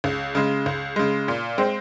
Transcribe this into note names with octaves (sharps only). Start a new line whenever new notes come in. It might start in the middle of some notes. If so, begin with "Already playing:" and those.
C#2
C#3 G#3
C#2
C#3 G#3
A#2
G#3 C4